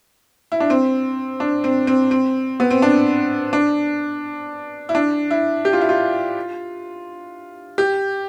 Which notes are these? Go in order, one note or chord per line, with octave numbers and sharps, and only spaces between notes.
E4
D4
C4
D4
C4
C4
C4
B3
C4
D4
D4
E4
D4
E4
G4
F4
E4
F4
G4